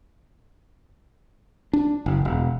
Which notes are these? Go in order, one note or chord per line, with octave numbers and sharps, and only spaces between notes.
D4
F#1
E1